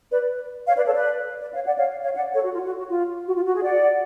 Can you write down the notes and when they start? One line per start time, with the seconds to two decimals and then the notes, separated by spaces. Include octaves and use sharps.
0.10 B4 D5
0.67 C#5 F5
0.76 B4 D5
0.85 A4 C#5
0.94 B4 D5
1.41 B4 D5
1.54 C#5 F5
1.66 D5 F#5
1.78 C#5 F5
2.03 C#5 F5
2.15 D5 F#5
2.34 A4 C#5
2.43 F#4
2.53 F4
2.65 F#4
2.78 F#4
2.90 F4
3.27 F#4
3.36 F4
3.46 F#4
3.55 G#4
3.64 D5 F#5